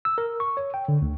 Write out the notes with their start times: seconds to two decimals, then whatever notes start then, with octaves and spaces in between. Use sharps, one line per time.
0.05 E6
0.18 A#4
0.40 C#6
0.57 C#5
0.74 G5
0.88 D3
1.02 D2